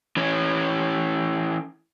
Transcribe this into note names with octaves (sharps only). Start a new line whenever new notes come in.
E3 C#4